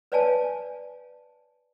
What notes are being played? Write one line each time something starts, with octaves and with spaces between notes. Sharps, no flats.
B4 C#5 D5 F5 G#5 A5